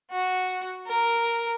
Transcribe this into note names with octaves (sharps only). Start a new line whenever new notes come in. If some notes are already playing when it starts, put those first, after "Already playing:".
F#4
A#4